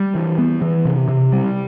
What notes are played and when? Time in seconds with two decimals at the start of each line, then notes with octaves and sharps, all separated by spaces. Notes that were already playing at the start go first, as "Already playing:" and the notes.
Already playing: G3
0.15 E3
0.38 B3
0.62 E3
0.85 C3
1.08 C3
1.32 G3